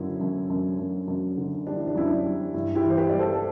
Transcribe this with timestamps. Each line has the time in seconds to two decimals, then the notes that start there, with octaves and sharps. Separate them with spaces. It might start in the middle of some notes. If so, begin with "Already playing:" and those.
Already playing: F#2 D3 E4
0.21 F#2
0.50 F#2
0.79 F#2
1.08 F#2
1.37 D3
1.67 G3 D4
1.76 E4
1.88 D4
1.95 F#2 E4
2.07 D4
2.24 G3
2.54 G2 E4
2.75 E4 G4
2.83 E3
2.90 C5
2.97 G4 B4
3.09 G3 D5
3.19 A4 C5
3.33 A4